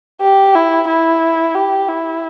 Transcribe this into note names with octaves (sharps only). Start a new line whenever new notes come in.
G4
E4
E4
G4
E4